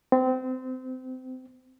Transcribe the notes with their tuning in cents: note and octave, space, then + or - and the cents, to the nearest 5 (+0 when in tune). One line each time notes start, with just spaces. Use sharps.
C4 -25